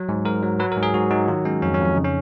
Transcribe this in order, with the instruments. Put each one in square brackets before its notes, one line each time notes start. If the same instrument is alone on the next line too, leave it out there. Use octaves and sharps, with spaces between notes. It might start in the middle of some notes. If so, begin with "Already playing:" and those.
Already playing: [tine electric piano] F#3
G#2
G#2 A#4
F#3
F#3 B4
A#4
G#2
G#4
G#2 F#4
F#3 D#4
D#3 F4
G#3 C#4
F2 C#4
C#4
F2
C#4
C#3 D#4
C#4